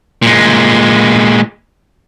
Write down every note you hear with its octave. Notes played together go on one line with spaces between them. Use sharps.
A#2 G#3